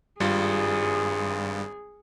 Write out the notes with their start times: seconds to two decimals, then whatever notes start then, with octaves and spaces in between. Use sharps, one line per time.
0.20 G#1 G2 G3 F4 G#4